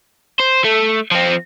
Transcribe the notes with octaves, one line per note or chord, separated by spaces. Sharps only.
C5
A3
F3 C4